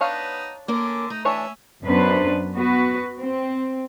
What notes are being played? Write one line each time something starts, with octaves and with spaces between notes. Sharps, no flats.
B3 D4 D#4 C#5 F5
D3 A#3 C#4 A#4 D6
A3 D#4
E3 C#4 D4 C#5 E5
F#2 B3 D4 B4 C5
B3 F#4 B4
C4